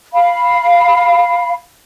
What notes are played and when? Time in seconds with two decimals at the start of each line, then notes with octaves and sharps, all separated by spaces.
0.13 F5 B5